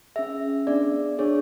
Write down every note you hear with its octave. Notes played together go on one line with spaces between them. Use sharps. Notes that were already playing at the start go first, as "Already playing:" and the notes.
C#4 G#4 E5
B3 D4 G#4 D5
D4 G#4 C#5